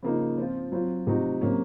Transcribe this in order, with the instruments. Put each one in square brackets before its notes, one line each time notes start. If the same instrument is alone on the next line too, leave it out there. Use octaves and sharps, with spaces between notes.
[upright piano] C#3 F3 A#3 D#4
F3 C4 F4
F#3 C4 F4
C3 F3 A3 D#4 F#4
C3 F#3 A#3 C#4